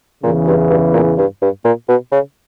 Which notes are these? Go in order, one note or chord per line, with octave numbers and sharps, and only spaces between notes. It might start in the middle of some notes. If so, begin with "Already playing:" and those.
E2 A#2 C#3 E3
G2
G2
A#2
G2
G2
A#2
B2
C#3